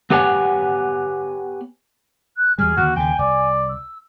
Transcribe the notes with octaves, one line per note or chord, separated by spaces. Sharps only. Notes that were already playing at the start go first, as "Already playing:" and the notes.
B3 G4 B4 C#5 F#5 G#5
F#6
E2 B2 G3 G#4 F6
D#2 D3 F#4
D#2 C#3 G5 G#5
C2 D5
E6